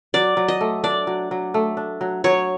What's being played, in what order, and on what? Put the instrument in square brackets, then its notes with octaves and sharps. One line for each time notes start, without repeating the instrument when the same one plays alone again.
[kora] F#3 [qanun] D5
[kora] F#3
[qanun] D#5
[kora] A3
[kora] D4 [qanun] D5
[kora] F#3
F#3
A3
D4
F#3
[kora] F#3 [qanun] C#5